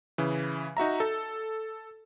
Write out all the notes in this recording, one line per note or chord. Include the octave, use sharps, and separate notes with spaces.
C#3 E3
D#4 F#4 E5 A#5
A4